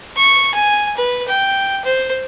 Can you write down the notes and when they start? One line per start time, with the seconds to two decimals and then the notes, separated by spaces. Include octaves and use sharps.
0.17 C#6
0.54 G#5
0.97 B4
1.28 G5
1.85 C5